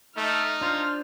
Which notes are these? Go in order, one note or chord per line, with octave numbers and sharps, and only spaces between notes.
A3 D#4 F6
D4 F4 C5